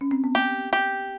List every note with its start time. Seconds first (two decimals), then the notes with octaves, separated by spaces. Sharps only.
0.01 C#4
0.11 C4
0.24 B3
0.35 A#3 G4
0.73 G4